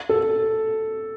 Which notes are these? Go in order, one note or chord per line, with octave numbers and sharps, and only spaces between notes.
A4